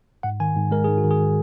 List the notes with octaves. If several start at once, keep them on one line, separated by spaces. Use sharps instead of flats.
G#2 F#5
D#3 G#5
G#2
G#3 A#4
G#2 G#4
F#4
D#3
G#4